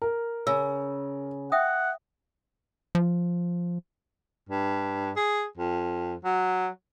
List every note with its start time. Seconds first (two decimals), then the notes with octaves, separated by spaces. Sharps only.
0.02 A#4
0.47 C#3 E6
1.52 E5 F#5 G5 D#6
2.95 F3
4.49 G2
5.16 G#4
5.57 F2
6.24 F#3